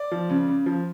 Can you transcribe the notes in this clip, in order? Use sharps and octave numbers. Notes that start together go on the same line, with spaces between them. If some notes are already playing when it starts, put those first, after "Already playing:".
Already playing: D5
F3
C#3
C#3
F3